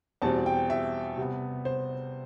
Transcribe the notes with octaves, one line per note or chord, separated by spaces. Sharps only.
E2 B2 G3 C4 A5
G5
E5
C3 G3 B3
C5